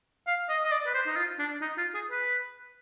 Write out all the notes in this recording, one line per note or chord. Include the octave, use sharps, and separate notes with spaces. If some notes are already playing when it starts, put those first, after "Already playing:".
F5
D#5
D#5
D5
B4
C5
D#4
F4
D4
D#4
F4
G#4
B4